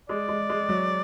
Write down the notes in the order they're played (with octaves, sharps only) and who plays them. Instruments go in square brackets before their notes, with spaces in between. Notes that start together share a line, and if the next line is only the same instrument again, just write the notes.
[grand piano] G#3 [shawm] D5
[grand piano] G#3
G#3
F#3